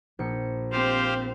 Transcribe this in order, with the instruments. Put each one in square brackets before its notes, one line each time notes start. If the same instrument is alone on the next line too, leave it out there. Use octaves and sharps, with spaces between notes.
[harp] A#1 C#7
[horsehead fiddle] C4 [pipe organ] G4 C5 F5